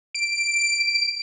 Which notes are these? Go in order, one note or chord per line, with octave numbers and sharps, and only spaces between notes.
D7